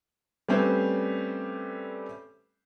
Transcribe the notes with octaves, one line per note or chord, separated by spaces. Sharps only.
G3 A3 C4 C#4 B4 C5